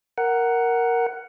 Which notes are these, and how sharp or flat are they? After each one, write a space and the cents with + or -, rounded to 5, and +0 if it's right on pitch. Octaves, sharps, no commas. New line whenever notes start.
A#4 +0 F#5 +10